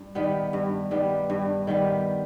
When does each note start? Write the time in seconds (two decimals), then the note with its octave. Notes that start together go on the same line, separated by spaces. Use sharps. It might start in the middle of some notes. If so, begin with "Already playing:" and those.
Already playing: G2
0.15 D#3 G3 B3
0.53 G2
0.91 D#3 G3 B3
1.30 G2
1.67 D#3 G3 B3